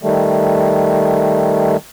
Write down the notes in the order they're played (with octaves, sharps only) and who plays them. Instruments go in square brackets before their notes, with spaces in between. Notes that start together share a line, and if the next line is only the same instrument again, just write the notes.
[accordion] D#3 G3 A3